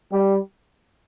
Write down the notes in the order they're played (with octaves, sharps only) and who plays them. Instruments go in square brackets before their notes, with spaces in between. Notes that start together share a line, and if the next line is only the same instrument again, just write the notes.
[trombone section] G3